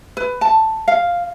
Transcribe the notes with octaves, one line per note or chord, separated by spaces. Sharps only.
B4
A5
F5